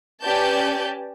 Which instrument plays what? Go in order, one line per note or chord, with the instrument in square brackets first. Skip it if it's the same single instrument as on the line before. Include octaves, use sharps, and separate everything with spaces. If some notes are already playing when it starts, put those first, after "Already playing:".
[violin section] C#4 G4 B4 D5 A5 G6